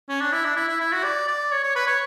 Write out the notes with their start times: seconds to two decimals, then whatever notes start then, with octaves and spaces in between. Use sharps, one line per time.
0.09 C#4
0.21 D4
0.33 E4
0.44 D4
0.57 E4
0.68 E4
0.81 E4
0.93 F#4
1.04 D5
1.28 D5
1.52 C#5
1.64 C#5
1.76 B4
1.87 C#5